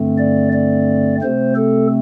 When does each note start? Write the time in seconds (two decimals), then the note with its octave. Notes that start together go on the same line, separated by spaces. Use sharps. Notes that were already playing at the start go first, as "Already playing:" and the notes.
Already playing: G2 D3 A3 C4
0.18 D5
0.53 D5
1.22 C3 A3 C4 C5
1.56 A4